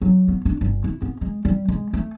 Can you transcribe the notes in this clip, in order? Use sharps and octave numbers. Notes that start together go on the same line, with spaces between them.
F#3
B3
D4
G1
E4
B3
G#3
G3
G#3
A3